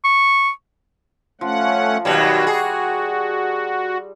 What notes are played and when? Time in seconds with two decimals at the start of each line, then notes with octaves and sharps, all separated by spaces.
0.05 C#6
1.41 F3 A3 C#4 F#5
2.05 D#2 B2 F#3 G3 F#4 A5
2.47 G#4